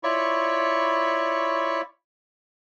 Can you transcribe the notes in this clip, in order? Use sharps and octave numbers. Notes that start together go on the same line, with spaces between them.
E4 F4 C#5 D5 B5 C#6